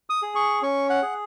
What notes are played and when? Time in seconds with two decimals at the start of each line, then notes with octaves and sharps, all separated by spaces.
0.10 D#6
0.22 G#4
0.35 C#6
0.62 C#4 C#6
0.90 F#5
1.02 G#4